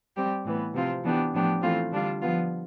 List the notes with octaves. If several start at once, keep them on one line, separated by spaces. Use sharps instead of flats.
G3 C4 G4
A2 E3 B3
C3 F3 C4 F4
E3 B3 D4 G4
A2 F3 B3 D4 G4
E3 A3 C4 F4
D3 G3 D4 F4
F3 B3 F4